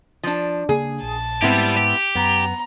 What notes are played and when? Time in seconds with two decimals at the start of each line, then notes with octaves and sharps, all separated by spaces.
0.23 F3 D4
0.69 C#3 A#3 D4 G#4
1.02 A#1 A5
1.42 G#2 G3 B3 C4 E4 G4
1.77 G4
2.15 F#2 B3 A#5